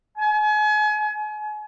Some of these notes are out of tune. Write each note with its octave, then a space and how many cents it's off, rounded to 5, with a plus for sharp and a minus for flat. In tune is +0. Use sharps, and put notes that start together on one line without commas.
G#5 +35